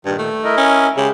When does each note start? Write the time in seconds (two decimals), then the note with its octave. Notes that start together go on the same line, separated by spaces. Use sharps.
0.05 G2 A#2 D#3
0.18 A3
0.44 E4 A#4 D#5
0.57 C#4
0.97 C#3 G#3 G4